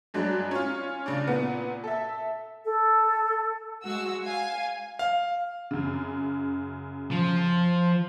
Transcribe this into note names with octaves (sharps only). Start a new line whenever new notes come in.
G2 F#3 G#3 D4
C#4 F4
C#3 D4
A#2 B3
A4 E5
A4
G#3 F#4 E6
F5 G#5
F5
F#2 C#3
F3